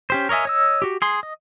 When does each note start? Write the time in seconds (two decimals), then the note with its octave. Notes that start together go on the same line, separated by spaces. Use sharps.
0.10 C#4 G4 C5
0.29 A#4 C#5 D#5 E5 G#5
0.45 C#5 D#5 E6
0.82 F#4 G4
1.02 G#4 C6
1.23 D#5